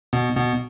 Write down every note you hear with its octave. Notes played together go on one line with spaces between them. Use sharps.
B2 B3
B2 B3